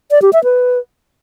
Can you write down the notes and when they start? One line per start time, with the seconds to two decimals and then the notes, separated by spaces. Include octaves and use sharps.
0.11 D5
0.22 G4
0.33 E5
0.44 B4